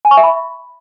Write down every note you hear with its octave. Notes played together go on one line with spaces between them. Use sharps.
G#5
C#6
E5
B5